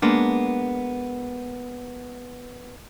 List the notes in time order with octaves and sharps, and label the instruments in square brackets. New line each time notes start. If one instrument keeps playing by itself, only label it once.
[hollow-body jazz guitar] G#3 A#3 B3 D4